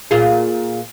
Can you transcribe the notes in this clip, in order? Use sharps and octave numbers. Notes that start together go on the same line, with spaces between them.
A#2 F4 G#4